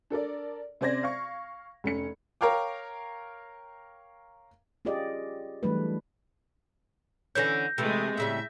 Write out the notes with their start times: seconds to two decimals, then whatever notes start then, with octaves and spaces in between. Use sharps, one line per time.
0.10 D4 A4 A#4 D5
0.81 C3 C#4 C5 D5 G#6 A#6
1.03 F5 C#6
1.84 F1 C#4 C#7
2.41 A#4 C#5 F5 G5 D6
4.85 C#4 F4 G4 G#4 D5 D#5
5.63 E3 F#3 G3 A3 D4 B4
7.35 D3 E3 C#4 G6 A#6
7.78 C3 E3 G#3 A3
8.18 A2 C#3 G3 E5